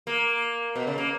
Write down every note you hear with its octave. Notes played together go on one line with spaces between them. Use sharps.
A#3
B2
C#3
A#3